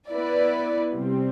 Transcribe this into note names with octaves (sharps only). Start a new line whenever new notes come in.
B3 E4 B4 D5
C3 G3 C4